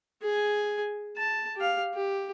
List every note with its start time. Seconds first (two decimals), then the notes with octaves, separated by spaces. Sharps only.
0.22 G#4 G#5
1.17 A5
1.56 G4 F5
1.94 G4